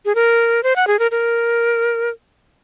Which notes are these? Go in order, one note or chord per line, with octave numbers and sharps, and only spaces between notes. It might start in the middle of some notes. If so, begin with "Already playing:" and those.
G#4
A#4
C5
F#5
G#4
A#4
A#4